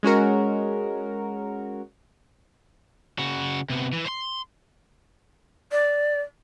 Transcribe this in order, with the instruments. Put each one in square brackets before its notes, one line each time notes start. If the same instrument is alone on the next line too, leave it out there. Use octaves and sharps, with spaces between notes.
[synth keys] G#3 C#4 F#4 A#4
[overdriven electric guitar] C#3 F#4
C3 B3
E3
C5 C6
[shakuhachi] D5